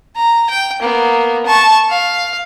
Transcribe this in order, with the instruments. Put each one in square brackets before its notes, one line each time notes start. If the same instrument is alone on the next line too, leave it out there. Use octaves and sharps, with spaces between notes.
[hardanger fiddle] A#5
G5
A#3 B3
A5 C#6
F5